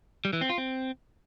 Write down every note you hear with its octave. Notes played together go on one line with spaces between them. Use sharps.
G3
E3
C4
F4
C4